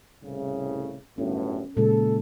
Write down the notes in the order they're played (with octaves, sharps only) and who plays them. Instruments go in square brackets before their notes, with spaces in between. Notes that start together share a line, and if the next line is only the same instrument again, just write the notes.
[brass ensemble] C2 A2 C#3
[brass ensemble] G1 F#2 A2 [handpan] C#4
[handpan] A#2 C#3 G#3 [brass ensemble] A4